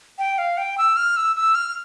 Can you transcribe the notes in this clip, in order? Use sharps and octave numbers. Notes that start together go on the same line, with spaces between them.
G5
F5
G5
E6
F6
E6
E6
F6